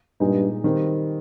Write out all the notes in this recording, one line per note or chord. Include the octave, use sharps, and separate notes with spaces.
G2 A#2 G#3 D#4 G#4
D#3 G3 C4